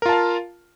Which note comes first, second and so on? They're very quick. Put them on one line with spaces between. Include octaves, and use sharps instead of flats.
A#4 F4 A5 F5